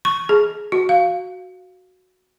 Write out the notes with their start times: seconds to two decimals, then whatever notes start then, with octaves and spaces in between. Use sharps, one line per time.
0.05 C#6
0.29 G#4
0.72 F#4
0.89 F5